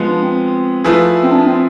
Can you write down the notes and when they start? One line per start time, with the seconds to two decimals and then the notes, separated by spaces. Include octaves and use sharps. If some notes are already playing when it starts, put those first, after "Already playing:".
Already playing: F3 G#3 B3
0.08 D4
0.23 C4
0.84 F3 A3 E4 G#4 B4
1.23 C4
1.32 D4
1.46 C4